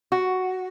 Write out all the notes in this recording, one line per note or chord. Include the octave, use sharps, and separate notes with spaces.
F#4